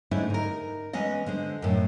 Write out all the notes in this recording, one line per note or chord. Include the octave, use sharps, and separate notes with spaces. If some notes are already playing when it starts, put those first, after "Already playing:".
G#2 D3 A3 C#4 D#4 E4
D#4 A#4
E3 G#3 B3 C#4 D#5
D3 G#3 C5
F#2 A2